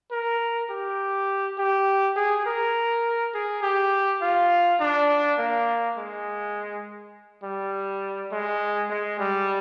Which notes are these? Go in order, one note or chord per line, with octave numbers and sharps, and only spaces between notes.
A#4
G4
G4
G#4
A#4
G#4
G4
F4
D4
A#3
G#3
G3
G#3
G#3
G3